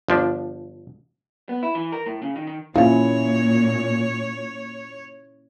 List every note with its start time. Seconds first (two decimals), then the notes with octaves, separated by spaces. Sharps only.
0.08 G1 F3 D4
1.49 B3
1.63 E4
1.75 E3
1.92 A#4
2.06 A2
2.22 C#3
2.36 D#3
2.47 D#3
2.76 A#2 F3 A#3 C#4 E4 C#5